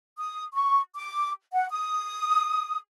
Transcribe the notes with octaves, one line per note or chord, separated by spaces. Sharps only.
D#6
C#6
D6
F#5
D#6